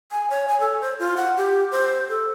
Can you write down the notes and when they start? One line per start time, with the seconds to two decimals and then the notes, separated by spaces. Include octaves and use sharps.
0.11 G#5
0.30 C#5
0.48 G#5
0.60 A4
0.81 C5
0.99 F4
1.17 F#5
1.37 G4
1.72 C5
2.09 A4